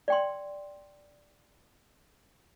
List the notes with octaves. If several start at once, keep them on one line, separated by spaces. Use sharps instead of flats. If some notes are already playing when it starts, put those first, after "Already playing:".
D5 G5 C6